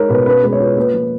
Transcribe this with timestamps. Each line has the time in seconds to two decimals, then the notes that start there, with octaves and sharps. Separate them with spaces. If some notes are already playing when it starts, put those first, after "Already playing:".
Already playing: G#3 D#4 A#4 C#5
0.09 B2 B4
0.26 C#4 B4
0.43 G#3 B4
0.52 C#5
0.60 F4 B4
0.77 A#3 B4
0.94 F3